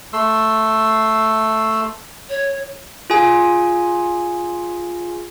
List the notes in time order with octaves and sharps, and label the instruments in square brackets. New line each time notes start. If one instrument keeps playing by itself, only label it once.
[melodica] A3 C6 E6
[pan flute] C#5
[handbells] F4 G#4 G#5